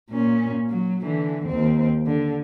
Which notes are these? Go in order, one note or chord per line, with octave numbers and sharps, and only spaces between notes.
A#2 C#4
F#3
D3 E3
D#2 C4
D3